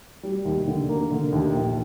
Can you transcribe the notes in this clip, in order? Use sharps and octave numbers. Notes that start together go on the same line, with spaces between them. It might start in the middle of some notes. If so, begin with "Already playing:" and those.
G3
D#2
D3
A#3
D3
D#2
A#1